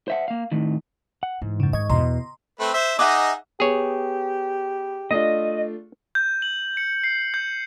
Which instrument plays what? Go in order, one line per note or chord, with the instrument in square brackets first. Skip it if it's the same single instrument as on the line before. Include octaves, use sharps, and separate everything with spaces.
[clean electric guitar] C5 E5 F#5
A#3 F5
A2 D#3
[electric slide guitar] F#5
[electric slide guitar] G#2 [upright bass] E3
[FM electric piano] F#2 C#3
[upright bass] D#3 [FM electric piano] D#5 C#6 G#6
[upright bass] E2 B2 [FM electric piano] D#5 A#5 C6
[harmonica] A3 C4 B4
C5 E5
[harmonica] D#4 G#4 D#5 [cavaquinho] E5 F#5 D6
[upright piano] B3 [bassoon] G4 [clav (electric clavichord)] G#4 C#5
[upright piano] A3 D4 F4 [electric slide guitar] D#5
[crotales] G6
F#7
C#7
C7
G6